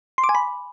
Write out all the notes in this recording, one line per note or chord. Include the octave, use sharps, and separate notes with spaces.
C6
D6
G#5
B5